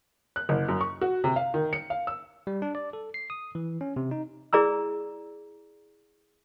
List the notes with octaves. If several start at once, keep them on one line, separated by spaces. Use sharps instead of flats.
F#6
F#1
F#2
C#6
F#4
C3
F5
D#3
C#7
F5
E6
G3
D4
D5
A4
C7
D#6
E3
C#4
C3
D#4
E4 G#4 D5 A#5 E6